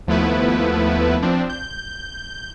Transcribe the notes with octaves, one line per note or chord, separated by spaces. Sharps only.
D#2 F3 A3 B3 E4 B4
F3 C4 D4
G6